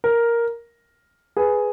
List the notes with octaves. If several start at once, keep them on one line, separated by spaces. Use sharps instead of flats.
A#4
G#4 B4